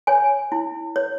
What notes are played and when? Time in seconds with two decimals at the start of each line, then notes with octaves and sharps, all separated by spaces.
0.07 C#5 G#5
0.52 E4
0.96 C#5